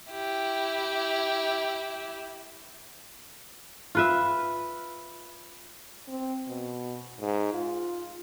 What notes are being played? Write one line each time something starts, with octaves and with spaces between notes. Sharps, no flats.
E4 G4
F4 B4 E5
C4
B2
G#2
F4